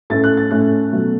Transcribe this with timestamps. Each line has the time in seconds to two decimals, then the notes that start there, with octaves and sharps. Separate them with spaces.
0.10 A2 A3 C#4 A6
0.24 F#6
0.37 A6
0.51 A2 A3 C#4 F#6
0.93 B2 F#3 A3